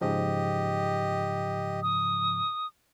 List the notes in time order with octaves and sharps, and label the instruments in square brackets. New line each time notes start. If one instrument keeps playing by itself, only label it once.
[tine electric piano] G#2 C#3 F3 [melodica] G4 D#5
[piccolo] D#6